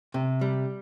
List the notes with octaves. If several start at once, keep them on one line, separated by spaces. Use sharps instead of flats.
C3
G3